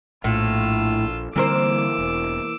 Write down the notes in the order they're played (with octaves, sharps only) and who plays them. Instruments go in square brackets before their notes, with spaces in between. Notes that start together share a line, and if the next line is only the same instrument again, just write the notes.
[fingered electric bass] A#1 [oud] A2 [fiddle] F4 E6
[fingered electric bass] D3 G3 C4 [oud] E3 A#3 C5 [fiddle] D6 E6
[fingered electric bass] E1